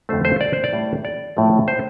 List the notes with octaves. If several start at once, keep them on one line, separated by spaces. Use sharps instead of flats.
F2 D3 A3 C5
C5
D5
C5
D5
A2 G3
D5
A2 F3 A3
C5